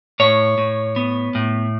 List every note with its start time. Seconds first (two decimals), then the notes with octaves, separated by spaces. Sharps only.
0.20 A2 C#5
0.58 A2
0.96 B3
1.35 A2